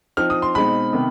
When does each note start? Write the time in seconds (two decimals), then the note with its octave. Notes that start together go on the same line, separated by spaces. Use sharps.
0.17 F3 C4 D#4 F6
0.30 D#6
0.42 C6
0.55 B2 G#3 C4 D#4 B5
0.93 C3 D#3 B3